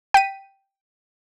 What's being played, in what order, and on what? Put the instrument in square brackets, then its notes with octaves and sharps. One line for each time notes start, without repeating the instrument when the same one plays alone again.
[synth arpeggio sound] G5 B6 D#7